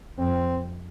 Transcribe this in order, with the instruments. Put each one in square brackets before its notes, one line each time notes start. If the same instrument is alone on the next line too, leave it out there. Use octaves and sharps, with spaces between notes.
[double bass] F2 [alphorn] C4